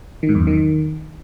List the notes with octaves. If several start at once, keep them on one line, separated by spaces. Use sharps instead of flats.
D#3
G#2
E2
F#2
D#3